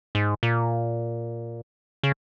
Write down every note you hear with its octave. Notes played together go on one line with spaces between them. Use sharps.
G#2
A#2
C#3